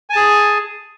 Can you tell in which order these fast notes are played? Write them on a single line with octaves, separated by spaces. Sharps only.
G#5 A5 G#4